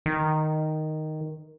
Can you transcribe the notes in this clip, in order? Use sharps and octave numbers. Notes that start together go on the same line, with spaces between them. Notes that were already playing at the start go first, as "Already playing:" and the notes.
D#3